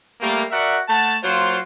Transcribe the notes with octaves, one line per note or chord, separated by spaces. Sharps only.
G3 A3 A#3
F#4 A#4 D5 E5 F#5
A3 F#5 A5
F#3 A#3 F4 C5